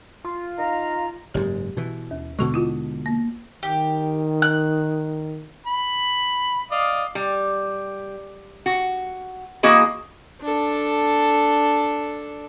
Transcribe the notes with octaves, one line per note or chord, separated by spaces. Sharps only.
F4
D#4 F5 A#5
F#1 G#2 G4
B2 E3
D#2
B2 D3 G#3 F#4 C#6
E4 F4
A#3
D#3 G4
F#6
B5
D5 D#5 F5
G3
F#4
E3 A#3 F#4 G#4 D#5
D4 A4